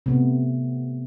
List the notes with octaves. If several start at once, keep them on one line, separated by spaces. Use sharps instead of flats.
C3 A3 B3